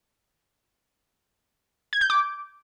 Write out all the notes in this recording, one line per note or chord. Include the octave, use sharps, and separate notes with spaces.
G#6
G6
D6